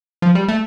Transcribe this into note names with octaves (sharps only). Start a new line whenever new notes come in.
F3
G3
A3